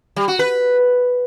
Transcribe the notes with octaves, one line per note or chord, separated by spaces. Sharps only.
G3
F#4
B4